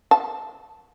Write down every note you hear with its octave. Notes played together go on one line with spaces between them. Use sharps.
A5